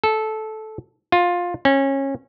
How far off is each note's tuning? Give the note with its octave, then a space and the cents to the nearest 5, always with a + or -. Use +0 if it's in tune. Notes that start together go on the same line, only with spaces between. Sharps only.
A4 -15
F4 +15
C#4 -20